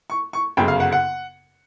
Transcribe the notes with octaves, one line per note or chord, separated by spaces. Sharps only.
C#6
C#6
G1 F#2 C#3 G5
F5
F#5
F#5